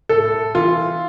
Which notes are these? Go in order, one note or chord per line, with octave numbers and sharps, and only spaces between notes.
A2 A4
E3 F4